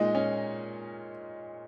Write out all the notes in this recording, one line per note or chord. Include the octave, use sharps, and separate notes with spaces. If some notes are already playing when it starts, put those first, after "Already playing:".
Already playing: A#2 G#3 D#4
C#4